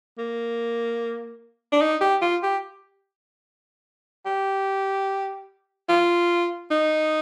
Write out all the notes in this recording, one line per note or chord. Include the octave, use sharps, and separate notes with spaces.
A#3
D4
D#4
G4
F4
G4
G4
F4
D#4